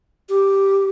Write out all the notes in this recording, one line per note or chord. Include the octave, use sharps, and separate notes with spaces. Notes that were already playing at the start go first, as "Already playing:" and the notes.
G4